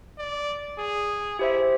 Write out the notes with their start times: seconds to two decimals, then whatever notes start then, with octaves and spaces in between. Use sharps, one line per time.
0.19 D5
0.79 G#4
1.39 E4 G4 C5 E5